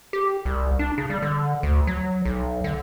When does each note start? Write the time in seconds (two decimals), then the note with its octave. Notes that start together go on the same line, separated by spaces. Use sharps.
0.13 G4
0.45 C2
0.79 D4
0.98 C#3
1.10 G3
1.22 D3
1.63 D2
1.87 F#3
2.25 B1
2.64 D3